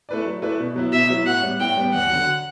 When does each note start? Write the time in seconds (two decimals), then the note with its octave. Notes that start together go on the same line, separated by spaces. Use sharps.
0.09 A3 E4 B4 D5
0.26 F#3
0.42 A3 E4 B4 D5
0.60 B2
0.76 F#3 B3 E4
0.92 B2 E5
1.10 F#3 B3 E4
1.26 A2 F#5
1.43 G3 B3
1.60 A2 G5
1.77 G3 B3
1.94 E2 F#5
2.10 D3 F#3